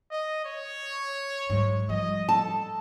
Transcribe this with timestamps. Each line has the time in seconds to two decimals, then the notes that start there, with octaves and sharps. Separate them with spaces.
0.11 D#5
0.44 C#5
1.50 G#2 F#3
1.89 F3 G3 D#5
2.29 A4 A5